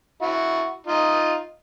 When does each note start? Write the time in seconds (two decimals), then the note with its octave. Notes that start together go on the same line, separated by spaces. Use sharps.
0.21 E4 F#4
0.87 D#4 F4